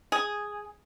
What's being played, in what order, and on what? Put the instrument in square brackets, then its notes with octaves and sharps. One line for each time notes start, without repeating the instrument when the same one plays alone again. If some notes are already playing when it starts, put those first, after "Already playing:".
[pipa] G#4